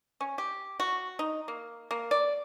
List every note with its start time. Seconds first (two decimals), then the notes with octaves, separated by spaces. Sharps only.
0.21 C#4
0.38 G4
0.80 F#4
1.19 D#4
1.48 A#3
1.91 A#3
2.11 D5